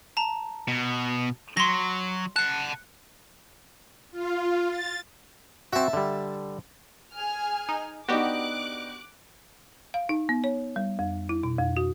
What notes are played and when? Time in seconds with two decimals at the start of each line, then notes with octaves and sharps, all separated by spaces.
0.17 A5 A#5
0.68 B2
1.57 F#3 C6 A#6
2.36 F#5 A5 F#6
4.11 F4
4.69 A6
5.73 C4 F#4 E5 A5
5.93 D3 G3
7.14 G#4 G#5 F6
7.69 D#4
8.08 B3 D4 D#4 F#4 G4 D6 F#6
9.94 F5
10.09 D#4
10.29 B3
10.44 C#5
10.76 G3
10.99 F2
11.29 E4
11.43 B2
11.59 F2
11.77 F#4